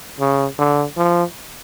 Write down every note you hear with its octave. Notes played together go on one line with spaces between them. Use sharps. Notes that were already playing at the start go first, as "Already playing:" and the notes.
C#3
D3
F3